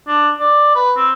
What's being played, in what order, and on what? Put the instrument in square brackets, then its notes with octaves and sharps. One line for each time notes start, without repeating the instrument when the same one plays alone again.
[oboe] D4
D5
B4
C4